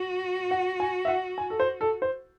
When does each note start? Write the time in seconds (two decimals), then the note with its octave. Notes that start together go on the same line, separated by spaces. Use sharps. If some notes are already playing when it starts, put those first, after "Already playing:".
Already playing: F#4
0.51 F#5
0.80 G#5
1.05 E5
1.08 F#5
1.38 G#5
1.50 A4
1.60 C5
1.81 A4
2.02 C5